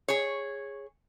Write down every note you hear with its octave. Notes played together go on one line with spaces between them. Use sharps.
G#4 C#5